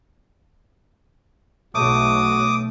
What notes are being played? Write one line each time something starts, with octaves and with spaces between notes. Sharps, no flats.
B1 A3 F#4 D6 D#6